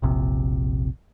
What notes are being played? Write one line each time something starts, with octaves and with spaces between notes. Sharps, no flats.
E1 A#1 C3